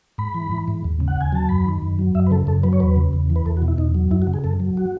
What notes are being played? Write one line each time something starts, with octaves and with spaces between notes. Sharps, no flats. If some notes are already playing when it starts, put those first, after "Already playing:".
G#2 B5
E3
E3
G#2
D#2
C#3
F#5
D#2 G#5
F#3 A5
F#2 B5
D#3
F#2
F#3
F#2 E5
B4
C#3 A4
F#2 A4
F#3 B4
C#5
E2 B4
C#3
E2
E3
B4
E2 A4
F#4
B2
E4
E2 D#4
F#3
F#2 E4
F#4
C#3
G#4
F#2 A4
F#3
F#4